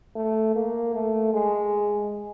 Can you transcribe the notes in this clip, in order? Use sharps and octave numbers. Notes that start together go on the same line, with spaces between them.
A3
A#3
A3
G#3